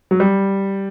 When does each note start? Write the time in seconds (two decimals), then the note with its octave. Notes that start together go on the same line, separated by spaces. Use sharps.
0.11 F#3
0.20 G3